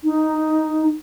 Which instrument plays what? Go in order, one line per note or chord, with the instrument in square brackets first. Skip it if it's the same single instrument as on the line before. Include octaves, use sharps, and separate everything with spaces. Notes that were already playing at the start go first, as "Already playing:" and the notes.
[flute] D#4